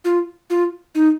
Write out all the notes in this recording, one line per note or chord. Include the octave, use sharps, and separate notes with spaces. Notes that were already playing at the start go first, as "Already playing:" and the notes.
F4
F4
D#4